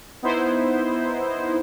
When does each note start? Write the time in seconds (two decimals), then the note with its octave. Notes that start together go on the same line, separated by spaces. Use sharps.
0.22 B3 D#4 E4 C5